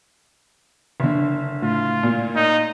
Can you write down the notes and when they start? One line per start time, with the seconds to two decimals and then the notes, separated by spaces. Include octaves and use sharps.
1.00 F#1 D3
1.62 A2 F4
2.03 A#2
2.36 D#4